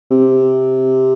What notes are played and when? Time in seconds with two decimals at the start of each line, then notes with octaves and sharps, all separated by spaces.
0.11 C3